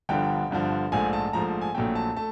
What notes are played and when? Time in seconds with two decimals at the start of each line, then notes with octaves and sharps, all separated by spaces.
0.09 G1 G2 D3 F3 G5
0.51 G1 G2 D3 F3
0.92 A#1 G#2 F3 A3 G#5
1.13 A5
1.33 A#1 G#2 F3 A3 A#5
1.61 G#5
1.75 A#1 A#2 F#3 A3 G5
1.95 A5
2.17 A3 A5